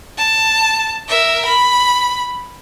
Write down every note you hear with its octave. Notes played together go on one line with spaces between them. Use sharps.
A5
A#4 E5
B5